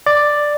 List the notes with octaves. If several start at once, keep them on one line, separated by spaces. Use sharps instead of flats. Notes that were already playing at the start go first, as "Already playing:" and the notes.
D5